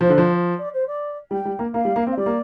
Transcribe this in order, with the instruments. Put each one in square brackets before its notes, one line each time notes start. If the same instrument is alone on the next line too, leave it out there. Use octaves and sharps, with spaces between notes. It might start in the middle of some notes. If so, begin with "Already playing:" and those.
[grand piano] F3 [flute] C5
[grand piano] D3
F3
[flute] D5
C5
D5
[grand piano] G3 [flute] G5
[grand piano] G3
A#3
[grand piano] A#3 [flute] F5
[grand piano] G3
A#3
C4
[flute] F5
[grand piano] G3 [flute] D5
[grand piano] A#3